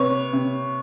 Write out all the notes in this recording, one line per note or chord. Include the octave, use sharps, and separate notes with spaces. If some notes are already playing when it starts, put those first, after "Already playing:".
Already playing: C3 B4 C#5
C3